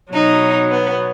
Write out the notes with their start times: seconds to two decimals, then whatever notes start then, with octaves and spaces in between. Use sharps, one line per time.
0.12 B2 F#3 D#4
0.70 B3